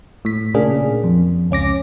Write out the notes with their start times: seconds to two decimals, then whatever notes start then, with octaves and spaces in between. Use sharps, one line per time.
0.25 A2 B6
0.54 A#2 C#3 A#3 D4 G#4
1.04 F2
1.51 C#2 C#4 D6 A#6